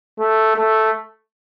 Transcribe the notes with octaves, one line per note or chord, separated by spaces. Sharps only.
A3
A3